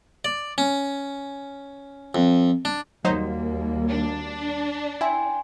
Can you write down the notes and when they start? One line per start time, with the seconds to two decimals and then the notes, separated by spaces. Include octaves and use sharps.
0.25 D5
0.58 C#4
2.15 F2
2.65 D4
3.05 D#2 F#3 G3 A#3 D#4 F#4 C5
3.88 D4
5.01 E4 G5 G#5 C6